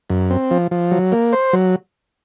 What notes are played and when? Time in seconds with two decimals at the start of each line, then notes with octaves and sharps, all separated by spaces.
0.10 F#2
0.30 C4
0.51 F3
0.71 F3
0.91 F#3
1.12 A#3
1.33 C5
1.53 F#3